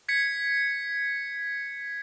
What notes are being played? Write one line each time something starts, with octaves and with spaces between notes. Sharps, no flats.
G#6 B6 C#7